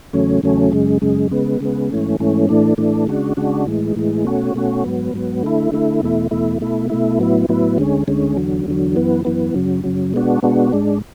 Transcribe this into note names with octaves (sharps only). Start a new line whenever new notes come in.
E2 C#3 F#3 A3 C#4
E2 C#3 F#3 A3 C#4
F#2 C#3 G#3
F#2 C#3 G#3
C#3 G#3 B3
C#3 G#3 B3
G#2 E3 A3 C#4
G#2 E3 A3 C#4
A2 E3 A3 D4
A2 E3 A3 D4
C#3 G#3 D4 F#4
C#3 G#3 D4 F#4
A2 E3 G#3
A2 E3 G#3
B2 A3 C#4 F#4
B2 A3 C#4 F#4
G#2 F#3 B3
G#2 F#3 B3
D3 A3 E4
D3 A3 E4
E2 B2 A3 E4
E2 B2 A3 E4
B2 A3 E4
B2 A3 E4
A2 F#3 B3 E4
A2 F#3 B3 E4
D2 D3 G#3 C#4
D2 D3 G#3 C#4
E2 D3 F#3
E2 D3 F#3
F#2 E3 B3
F#2 E3 B3
F#2 C#3 F#3
F#2 C#3 F#3
B2 G#3 B3 D4 F#4
B2 G#3 B3 D4 F#4
G#2 G#3 D4